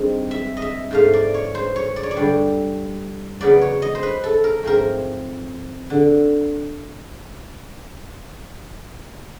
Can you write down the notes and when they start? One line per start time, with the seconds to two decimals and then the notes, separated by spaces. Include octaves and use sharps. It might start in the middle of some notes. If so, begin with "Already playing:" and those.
Already playing: G2 D#3 G#3 C4
0.31 E5
0.57 D#5
0.62 E5
0.91 G#2 F3 A3 F5
1.14 D5
1.34 C#5
1.55 C5
1.76 C#5
1.96 D5
2.03 C#5
2.11 D5
2.17 G2 D3 G3
3.41 E2 C#3 F#3 B3 D5
3.61 C#5
3.82 D#5
3.95 C5
4.03 B4
4.24 A4
4.44 A#4
4.63 G#2 F3 A3 C4 A#4
5.90 D3